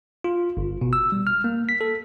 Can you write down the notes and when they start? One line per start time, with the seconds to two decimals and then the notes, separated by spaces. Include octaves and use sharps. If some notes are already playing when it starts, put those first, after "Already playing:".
0.24 F4
0.57 G1
0.81 B2
0.93 E6
1.12 G3
1.27 F6
1.44 A#3
1.69 B6
1.81 A4